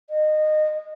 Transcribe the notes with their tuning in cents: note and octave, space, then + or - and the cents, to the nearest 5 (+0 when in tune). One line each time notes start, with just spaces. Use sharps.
D#5 -20